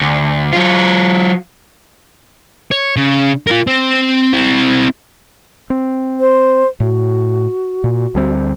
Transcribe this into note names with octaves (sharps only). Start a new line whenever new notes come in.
D2
F#3 F4
C#5
C#3
F4 A#4
C4
C4 E4
C4
C5
A2 F#4
A#2
D2 G3 C4